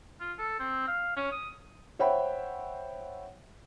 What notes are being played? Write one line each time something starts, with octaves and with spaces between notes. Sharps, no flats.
F4
A4
C4
F5
C#4
D#6
C5 C#5 E5 F#5 G5 B5